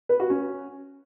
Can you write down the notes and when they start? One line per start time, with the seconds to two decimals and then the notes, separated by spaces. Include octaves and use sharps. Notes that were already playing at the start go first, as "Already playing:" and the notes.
0.09 B4
0.20 F#4
0.30 C#4